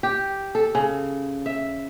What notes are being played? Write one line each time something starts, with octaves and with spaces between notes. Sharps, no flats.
G4
A4
C#3
E5